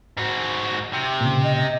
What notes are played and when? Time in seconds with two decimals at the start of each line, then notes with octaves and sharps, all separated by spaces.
0.17 G#2 F#4
0.93 C3
1.21 A#2 C#3
1.44 D#5